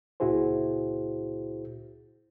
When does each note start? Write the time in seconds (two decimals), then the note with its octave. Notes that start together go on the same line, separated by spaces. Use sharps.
0.20 C#2 A#2 E4 F#4 G#4 C5